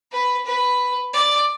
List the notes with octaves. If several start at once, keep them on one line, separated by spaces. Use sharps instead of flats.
B4
B4
D5